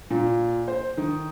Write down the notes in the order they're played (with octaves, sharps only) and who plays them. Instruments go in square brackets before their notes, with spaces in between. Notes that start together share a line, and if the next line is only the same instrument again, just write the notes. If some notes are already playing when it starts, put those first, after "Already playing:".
[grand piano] A#2
C5
D#3